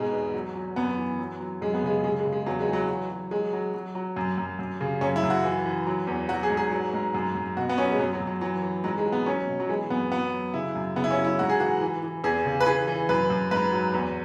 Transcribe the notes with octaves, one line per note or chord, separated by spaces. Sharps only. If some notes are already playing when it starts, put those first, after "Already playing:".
Already playing: G#2 B2 G#3
E2
F#3
F#3
F#2 B3
E3
F#3
F#3
F#2 G#3
B3
C#3 G#3
C#3 G#3
G#3
C#3
G#3
E2 F#3
G#3
E3
F#3
F#3
F#3
F#3 G#3
F#3
F#3
F#3
F#2
F#2
F#2
C#3
F#2 C#4
E4
F#2
F#4
E3
E3
F#3
E2
F#3 F#4
G#4
G#2
G#4
F#3
G#2
F#2
F#2
B2 F#4
B3
F#3 C#4
G#3
F#2 B3
F#3
F#2
F#3
E3 F#3
E3
G#2 F#3
G#3
F#3
B3
F#3 C#4
B2
F#3
E3 G#3
F#2 B3
F#3 B3
F#3
C#3 E4
F#2
C#3 B3
E4
C#4
F#3
E4
G#2 F#4
G#4
E3 F#4
E3
E3
E2 G#4
C#3
B4
E3 G#4
E3
F#2 B4
F#2
G#2 B4
F#3
E2